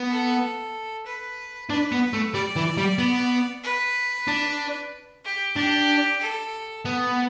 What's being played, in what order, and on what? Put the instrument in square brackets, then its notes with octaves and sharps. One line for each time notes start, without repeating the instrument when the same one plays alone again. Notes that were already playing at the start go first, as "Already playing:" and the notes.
Already playing: [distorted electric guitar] B3
[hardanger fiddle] A4
B4
[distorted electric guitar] D4 [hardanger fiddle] B4
[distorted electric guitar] B3
A3
[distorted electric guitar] G3 [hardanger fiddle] D5
[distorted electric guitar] E3
G3
B3
[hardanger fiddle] B4
[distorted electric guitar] D4
[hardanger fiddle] G4
[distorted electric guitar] D4 [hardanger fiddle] G4
[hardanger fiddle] A4
[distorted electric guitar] B3